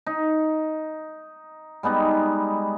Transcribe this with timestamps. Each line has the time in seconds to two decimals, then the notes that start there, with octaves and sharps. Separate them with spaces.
0.06 D#4
1.83 G3 G#3 B3 D#4